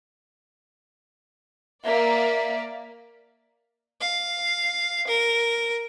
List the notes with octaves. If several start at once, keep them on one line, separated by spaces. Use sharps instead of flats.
A#3 D5 E5
F5
A#4